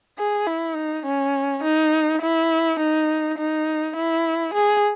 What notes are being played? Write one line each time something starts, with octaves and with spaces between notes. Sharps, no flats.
G#4
E4
D#4
C#4
D#4
E4
D#4
D#4
E4
G#4